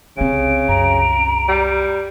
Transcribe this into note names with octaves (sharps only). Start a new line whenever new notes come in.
C2 C#3 C4 D7
C2 F#2 A#5
G3